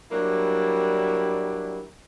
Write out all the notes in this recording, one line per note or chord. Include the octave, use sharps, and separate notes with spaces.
F#3 G3 A#3 D4 E4